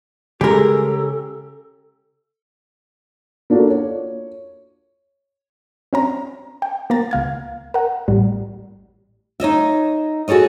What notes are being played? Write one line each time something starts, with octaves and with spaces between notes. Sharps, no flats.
C#3 G#3 C#4 G4 A4 A#4
A#3 D4 F4 F#4 A4
C#5
C4 C#4 A#5
G5
A#3 B3 A#5 A6
C#2 F5 G#6
A#4 F#5
A1 A2 G3
D#4 C#5 D#5 E5
F#4 G#4 A4 C#5 D#5